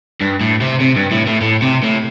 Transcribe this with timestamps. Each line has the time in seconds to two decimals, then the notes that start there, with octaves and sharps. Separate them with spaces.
0.21 G2
0.41 A2
0.62 C3
0.81 C3
0.97 G2
1.12 A2
1.27 A2
1.41 A2
1.62 C3
1.83 A2